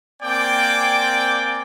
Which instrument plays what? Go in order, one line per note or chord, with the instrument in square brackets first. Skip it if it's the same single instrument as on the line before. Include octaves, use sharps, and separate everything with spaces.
[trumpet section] A#3 C4 D5 G5 G#5 D6